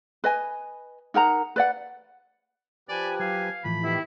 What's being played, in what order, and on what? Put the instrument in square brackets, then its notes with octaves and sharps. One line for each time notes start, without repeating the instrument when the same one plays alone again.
[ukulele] B4 D#5 G#5
D#4 A#4 F#5 A#5
B4 D5 F#5
[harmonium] F3 G4 B4 [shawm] D5 [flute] G#5
[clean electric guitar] F#3 [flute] F5 [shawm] G#5
[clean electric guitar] A2 E3 F3 [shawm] B5
[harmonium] D#3 B3 G4 [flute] E4